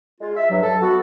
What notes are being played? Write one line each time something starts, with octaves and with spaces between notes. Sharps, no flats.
G#3 F4
E5
G2 F#3
A4
B3 F#4 A4